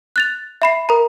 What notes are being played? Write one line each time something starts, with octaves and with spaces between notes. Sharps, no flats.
F#6 A6 F7
E5 B5 C7
A#4 A#5